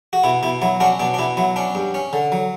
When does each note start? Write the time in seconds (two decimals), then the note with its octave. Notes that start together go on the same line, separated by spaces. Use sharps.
0.13 F#4
0.24 B2 E4
0.43 B2 E4
0.62 F#3 E4
0.80 C#4 D4 F#4
1.00 B2 D4
1.14 D4
1.19 B2 E4
1.37 F#3 E4
1.56 C#4 D4
1.75 G2
1.94 C#4
2.13 D3
2.32 F#3